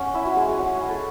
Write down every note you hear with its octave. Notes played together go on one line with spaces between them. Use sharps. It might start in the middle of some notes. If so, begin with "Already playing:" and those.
Already playing: G#3 C#4 F#5
E4 E5
F#4
G#3 G#4
G#4
C#4 F#4
G#4
E4
A4